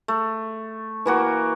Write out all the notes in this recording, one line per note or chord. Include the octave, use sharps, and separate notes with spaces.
A3
E3 A#3 F#4